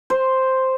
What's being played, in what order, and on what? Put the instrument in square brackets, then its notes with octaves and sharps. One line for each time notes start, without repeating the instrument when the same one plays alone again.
[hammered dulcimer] C5